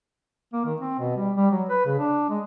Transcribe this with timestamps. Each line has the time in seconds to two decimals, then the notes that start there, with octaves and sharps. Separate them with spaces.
0.53 A#3
0.65 D#3
0.80 C4
0.99 B2
1.16 G3
1.36 G3
1.51 F#3
1.69 B4
1.86 C#3
1.98 D4
2.29 G#3